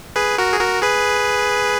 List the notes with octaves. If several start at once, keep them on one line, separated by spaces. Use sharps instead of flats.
G#4 B4
F#4 A#4
G#4
F#4 A#4
G#4 B4